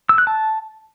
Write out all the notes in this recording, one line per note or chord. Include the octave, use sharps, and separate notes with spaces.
E6
F#6
A5